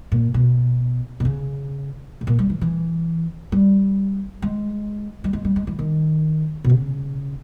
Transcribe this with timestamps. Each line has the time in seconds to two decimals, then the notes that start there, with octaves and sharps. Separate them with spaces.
0.12 A#2
0.34 B2
1.20 B2
1.25 C#3
2.21 G#2
2.27 A#2
2.39 G3
2.50 E3
2.61 E3
3.52 G3
4.42 G#3
5.24 G3
5.33 G#3
5.45 G3
5.56 G#3
5.67 E3
5.79 D#3
6.64 B2
6.70 C#3